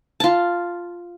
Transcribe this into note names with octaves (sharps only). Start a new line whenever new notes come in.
F4 A5